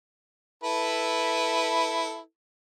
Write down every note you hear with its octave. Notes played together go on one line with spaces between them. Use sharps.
E4 A4 B4